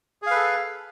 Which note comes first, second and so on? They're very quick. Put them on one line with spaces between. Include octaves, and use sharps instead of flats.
G#4 F5 B4 A4